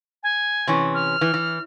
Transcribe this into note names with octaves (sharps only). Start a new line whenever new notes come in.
G#5
C3 E3 C#4
F6
E3
E3